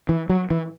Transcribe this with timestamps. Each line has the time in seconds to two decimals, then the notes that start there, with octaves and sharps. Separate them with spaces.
0.09 E3
0.29 F#3
0.50 E3